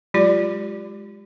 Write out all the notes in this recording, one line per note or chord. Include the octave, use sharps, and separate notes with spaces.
F#3 G#3 F4 G4 D5